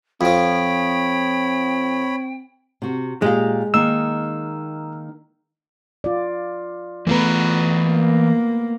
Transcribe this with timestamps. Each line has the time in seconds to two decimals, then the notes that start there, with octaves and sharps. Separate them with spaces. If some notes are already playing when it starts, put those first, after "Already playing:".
0.21 F2 F3 C4 C#5 G5 B5
2.82 C3 F#4
3.22 A#2 G#3 G4 F5
3.74 D#3 A#3 D#4 E6
6.04 F4 D5
7.07 E3 A3 B3 F4 B4 A#5
7.86 A#3